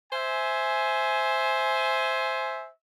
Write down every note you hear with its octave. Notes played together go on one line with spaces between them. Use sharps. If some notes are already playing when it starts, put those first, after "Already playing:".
C5 E5 G#5